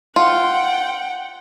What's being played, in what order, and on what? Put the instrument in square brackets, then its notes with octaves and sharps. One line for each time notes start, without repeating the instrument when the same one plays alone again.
[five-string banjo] F4 [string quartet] F#5 G5